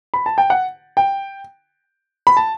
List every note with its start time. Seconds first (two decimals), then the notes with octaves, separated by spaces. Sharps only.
0.14 B5
0.26 A5
0.38 G5
0.50 F#5
0.97 G5
2.27 B5
2.37 A5